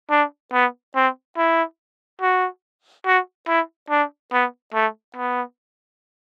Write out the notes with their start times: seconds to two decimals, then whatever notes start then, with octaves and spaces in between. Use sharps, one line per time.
0.10 D4
0.53 B3
0.95 C4
1.37 E4
2.21 F#4
3.06 F#4
3.48 E4
3.90 D4
4.32 B3
4.74 A3
5.16 B3